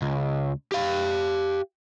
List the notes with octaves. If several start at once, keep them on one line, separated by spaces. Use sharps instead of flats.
C#2
G4 F5